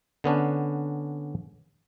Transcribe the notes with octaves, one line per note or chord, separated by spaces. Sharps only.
D3 B3 C#4 D4